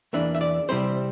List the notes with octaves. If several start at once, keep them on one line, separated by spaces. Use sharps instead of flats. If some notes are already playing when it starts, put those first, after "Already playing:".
E2 E3 A#3 D4 E5
E5
D5
C3 G3 C4 E4 C5